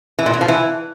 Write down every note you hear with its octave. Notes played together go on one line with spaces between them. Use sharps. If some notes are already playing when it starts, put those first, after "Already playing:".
E3
A#2
E3
F3
E3